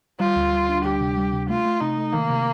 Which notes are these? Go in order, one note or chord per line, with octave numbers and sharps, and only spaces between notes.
G3 F4
D2
G3
D4
D2 G4
C3
G3
C3
A3 F4
A3
C3 D#4
A3
D#3 A#3
C3